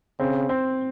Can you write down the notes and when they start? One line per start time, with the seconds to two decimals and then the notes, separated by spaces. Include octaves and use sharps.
0.20 C#3 C4
0.49 C4